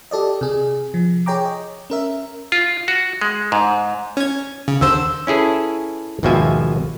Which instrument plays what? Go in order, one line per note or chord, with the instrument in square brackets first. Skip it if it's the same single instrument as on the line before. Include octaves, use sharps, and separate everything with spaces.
[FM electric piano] G4 A4 D5 D#5
C3 G#4
F3
G#4 C#5 G5 A#5 D6
D#5
C#4 A#4 E5
[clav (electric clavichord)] F4
F#4
G#3
G#2
[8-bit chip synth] C#4 G#6
C#3
[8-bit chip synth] D#2 D3 C5 [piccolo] E6
[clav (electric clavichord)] C#4 E4 G#4 A4 B4
G#1 D#2 B2 F3 E5 G#5